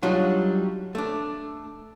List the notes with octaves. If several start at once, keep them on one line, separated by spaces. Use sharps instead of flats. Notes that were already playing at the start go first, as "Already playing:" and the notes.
F#3 G3 D4 D#4 F4 F#4
A3 D4